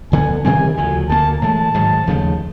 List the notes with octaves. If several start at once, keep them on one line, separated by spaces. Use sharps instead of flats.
D2 D3 G3 B3 G#5
C3 D#3 G3 C4 G#5
D2 C#3 F3 G#5
D2 D3 F3 A#3 A5
A2 E3 G#3 A5
G#2 D#3 F#3
D#2 C#3 F3 A3